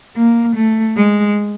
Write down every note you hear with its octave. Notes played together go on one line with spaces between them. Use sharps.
A#3
A3
G#3